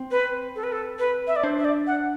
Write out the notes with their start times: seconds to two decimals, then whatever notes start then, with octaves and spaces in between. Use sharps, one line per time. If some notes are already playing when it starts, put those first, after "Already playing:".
Already playing: C4
0.11 B4
0.56 A4
0.64 B4
0.72 A4
0.99 B4
1.27 E5
1.36 D5
1.43 D4 C5
1.59 E5
1.65 D5
1.87 F#5